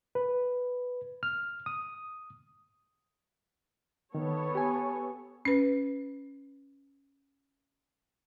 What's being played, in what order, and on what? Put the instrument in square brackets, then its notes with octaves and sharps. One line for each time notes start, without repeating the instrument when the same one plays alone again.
[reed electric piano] B4
F6
D#6
[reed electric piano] D#3 [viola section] B3 A4 C#5
[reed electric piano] G4 G#5
[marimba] C#4 B4